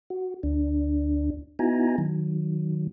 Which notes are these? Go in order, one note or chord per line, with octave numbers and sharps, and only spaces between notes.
F#4
D2 D4
B3 D#4 E4 F#4 G#5 A#5
D#3 F#3